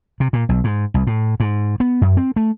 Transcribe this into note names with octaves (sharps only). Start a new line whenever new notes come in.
C3
A#2
B1
G#2
C2
A2
G#2
B3
F#2
C4
A3